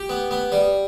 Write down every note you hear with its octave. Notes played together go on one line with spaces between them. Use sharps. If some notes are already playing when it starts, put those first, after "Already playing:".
Already playing: G4
B3
B3
G3